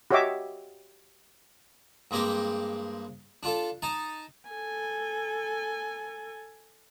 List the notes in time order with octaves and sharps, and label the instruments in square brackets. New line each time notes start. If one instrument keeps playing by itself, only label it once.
[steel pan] F#4 G4 C#5 D#5 E5 D6
[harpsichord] G2 G#3 A#3 C4 G4
D4 F4 A4
D#4 A5 A#5
[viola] A4 G#5